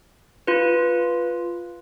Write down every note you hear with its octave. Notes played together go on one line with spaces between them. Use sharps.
F4 B4